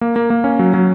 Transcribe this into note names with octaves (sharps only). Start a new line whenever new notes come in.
A#3
A#3
A#3
C#4
F#3
F#3